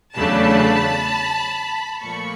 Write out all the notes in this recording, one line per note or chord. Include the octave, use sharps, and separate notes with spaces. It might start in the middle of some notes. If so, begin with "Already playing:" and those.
E2 C#3 F#3 A3 D4 A5 B5
A#2 F3 A3 B5 C#6